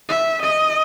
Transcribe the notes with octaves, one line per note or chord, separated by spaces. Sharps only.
E5
D#5